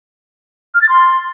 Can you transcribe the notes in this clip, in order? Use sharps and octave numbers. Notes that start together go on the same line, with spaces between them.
F6
A6
C6